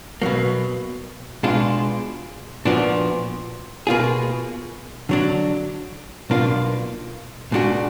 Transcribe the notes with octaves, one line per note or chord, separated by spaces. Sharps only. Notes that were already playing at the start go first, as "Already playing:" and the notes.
B2 F#3 A#3
B2 G#3 D4 F4
A#2 F3 B3 D4 F#4
B2 A#3 F4 G#4
D3 F#3 D4
B1 B2 A#3 D4 F4
A#2 G#3 D4 F#4